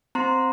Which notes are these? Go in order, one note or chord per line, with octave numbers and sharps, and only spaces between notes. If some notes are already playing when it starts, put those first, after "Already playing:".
C4 A#5 C6